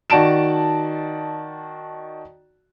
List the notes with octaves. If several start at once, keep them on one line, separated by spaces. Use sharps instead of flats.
D#3 F#4 D5 A5 D7 E7